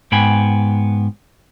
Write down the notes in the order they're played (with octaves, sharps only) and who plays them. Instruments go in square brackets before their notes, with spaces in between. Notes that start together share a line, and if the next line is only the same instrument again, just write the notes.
[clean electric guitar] G#2 B3 G5 G#5 B5